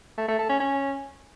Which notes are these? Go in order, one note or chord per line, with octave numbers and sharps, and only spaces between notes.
A3
A3
A4
C#4
C#4